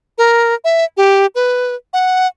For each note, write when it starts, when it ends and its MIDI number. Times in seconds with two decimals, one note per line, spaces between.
0.18 0.55 70
0.64 0.85 76
0.97 1.26 67
1.35 1.75 71
1.93 2.27 78